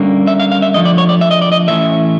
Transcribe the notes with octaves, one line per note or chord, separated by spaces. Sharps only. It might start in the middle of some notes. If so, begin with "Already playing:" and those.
Already playing: D3 G3 A#3 C#4
E5
F5
F5
E5
D3 F3 A3 D#5
D5
C#5
D5
E5
D#5
D5
D#5
A2 E3 A3 C#4 E5